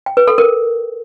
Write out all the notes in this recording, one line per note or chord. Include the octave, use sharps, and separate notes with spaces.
G5
B4
A4
A#4